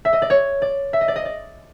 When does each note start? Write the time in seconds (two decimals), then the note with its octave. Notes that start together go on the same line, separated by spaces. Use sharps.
0.05 E5
0.13 D#5
0.22 D5
0.30 C#5
0.62 D5
0.93 E5
1.01 D#5
1.08 D5
1.16 D#5
1.25 D5